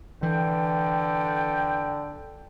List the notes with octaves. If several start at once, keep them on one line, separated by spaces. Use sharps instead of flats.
D3 E3 G5